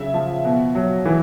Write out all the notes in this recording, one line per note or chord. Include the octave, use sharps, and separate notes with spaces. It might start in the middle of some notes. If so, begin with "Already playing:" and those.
Already playing: C#3 F#3 E5
F3
B2
F#3
E3